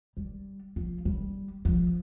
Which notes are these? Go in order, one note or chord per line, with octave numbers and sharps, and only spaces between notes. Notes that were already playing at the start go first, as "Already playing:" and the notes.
G3
F3
G3
F3